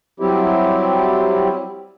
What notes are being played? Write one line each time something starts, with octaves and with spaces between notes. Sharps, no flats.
F#3 G3 C4 E4 G4